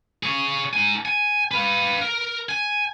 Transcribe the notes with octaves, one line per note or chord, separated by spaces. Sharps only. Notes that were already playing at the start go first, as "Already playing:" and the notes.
G#4 C#5
D#4 G#5
G#5
B4 F5
A#4
G#5